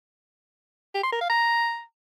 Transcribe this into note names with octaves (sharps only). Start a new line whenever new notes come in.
G4
C6
A#4
F5
A#5